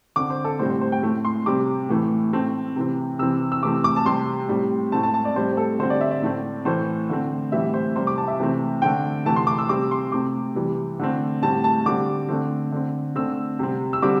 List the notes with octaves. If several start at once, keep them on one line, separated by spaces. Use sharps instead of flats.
D3 C4 D6
C5
A4
A2 G3 C4 C5
C5
C5
G5
A2 A3 C4
C6
C3 G3 C4 D6
A2 E3 A3
A2 A3 C4
C3 E3 C4
C3 E3 C4 E6
E6
C3 E3 A3 C4 D6
D6
A5
C3 G3 C4 C6
A2 G3 C4
A2 A3 C4 A5
A5
A5
D5
A2 G3 C4 C5
C5
A4
D3 G3 C4 C5
D5
E5
D5
A2 A3 C4
A2 E3 A3 C5
D3 A3 C4
A2 E3 G3 C4 E5
C5
C3 G3 C4 C5
D6
A5
E5
C3 E3 A3 C4
D3 A3 C4 G5
C3 E3 A3 A5
C6
D6
E6
C3 G3 C4 D6
C6
C3 A3 C4 D6
C3 E3 G3 C4
D3 A3 C4
A2 G3 C4 A5
A5
D3 G3 C4 D6
D3 A3 C4
D3 C4
D3 A3 C4 E6
C3 G3 C4
E6
D3 G3 C4 D6